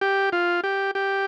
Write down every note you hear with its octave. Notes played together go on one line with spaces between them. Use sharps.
G4
F4
G4
G4